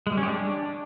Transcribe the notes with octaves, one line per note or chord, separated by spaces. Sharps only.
G#3
G3
C#4
G4
D4